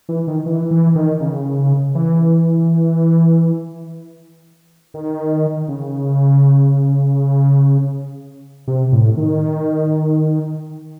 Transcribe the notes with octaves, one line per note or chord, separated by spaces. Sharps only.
E3
D#3
E3
E3
D#3
C#3
E3
D#3
C#3
C3
A2
D#3